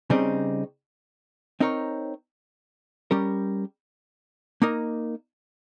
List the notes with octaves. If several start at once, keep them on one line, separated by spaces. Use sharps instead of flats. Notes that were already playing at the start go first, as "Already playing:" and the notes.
C#3 G3 C4 D#4
C4 D#4 A#4 C#5
G3 C#4 G4 A#4
A#3 D#4 A#4